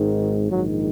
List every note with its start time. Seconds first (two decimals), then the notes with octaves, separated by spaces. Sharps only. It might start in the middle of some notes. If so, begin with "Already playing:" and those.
Already playing: G#1 G#2 D#3
0.50 A#1 G#2 D#3 F#3